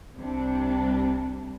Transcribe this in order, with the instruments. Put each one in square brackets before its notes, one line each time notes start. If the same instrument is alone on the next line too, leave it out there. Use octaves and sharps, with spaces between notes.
[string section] C2 C3 G3 D4